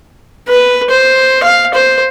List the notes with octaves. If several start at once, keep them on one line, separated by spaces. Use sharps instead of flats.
B4
C5
F5
C5